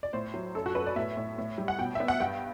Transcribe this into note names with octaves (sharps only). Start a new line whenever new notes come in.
D5
A2 C5
F#3
F#2 A4
F#4
F#2 B4
D5
A2 E5
A2
A2
G3
F#5
B2 G5
B3 E5
F#5
G2 G5